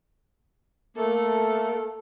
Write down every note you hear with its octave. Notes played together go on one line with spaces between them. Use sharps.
A3 A#3 A4